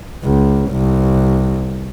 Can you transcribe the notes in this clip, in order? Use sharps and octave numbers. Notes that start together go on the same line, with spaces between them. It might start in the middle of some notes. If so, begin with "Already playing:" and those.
C#2
C2